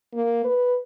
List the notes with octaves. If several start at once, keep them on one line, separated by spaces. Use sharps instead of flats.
A#3
B4